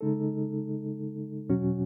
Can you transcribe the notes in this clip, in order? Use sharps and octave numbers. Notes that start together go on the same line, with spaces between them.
C#3 G#3 D#4 A4
E2 B2 F#3 C#4 F#4